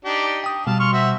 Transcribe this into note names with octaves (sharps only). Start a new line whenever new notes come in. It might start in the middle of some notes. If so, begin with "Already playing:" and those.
D4 D#4 G4
G5 D#6
B2 G3 F5 A5
C6 C#6 F6
F#4 C5 E5